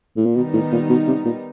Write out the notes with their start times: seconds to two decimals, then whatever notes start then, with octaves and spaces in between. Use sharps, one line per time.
0.17 A2
0.26 A#2
0.35 B2 D#3 G3 B3 D#4
0.53 A2
0.72 A#2
0.89 B2
1.07 C3
1.25 A#2